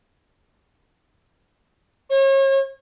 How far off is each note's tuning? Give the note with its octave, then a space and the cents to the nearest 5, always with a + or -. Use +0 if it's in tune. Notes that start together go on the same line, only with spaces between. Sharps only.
C#5 -40